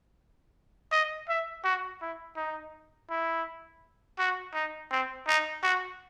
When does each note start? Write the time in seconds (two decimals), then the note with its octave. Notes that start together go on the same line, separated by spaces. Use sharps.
0.92 D#5
1.29 E5
1.64 F#4
2.01 E4
2.37 D#4
3.10 E4
4.19 F#4
4.54 D#4
4.91 C4
5.27 D#4
5.63 F#4